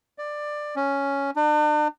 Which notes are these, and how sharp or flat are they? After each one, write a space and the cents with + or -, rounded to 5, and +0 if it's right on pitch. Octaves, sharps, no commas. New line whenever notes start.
D5 +15
C#4 +5
D4 +45